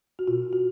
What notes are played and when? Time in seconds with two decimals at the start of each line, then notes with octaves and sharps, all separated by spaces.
0.19 F#4
0.28 B2 F4
0.53 F#4